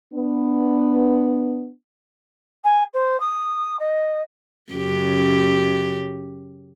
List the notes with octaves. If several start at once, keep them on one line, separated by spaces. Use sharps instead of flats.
B3 D4
G#5
C5
D#6
D#5
F#2 C#3 G4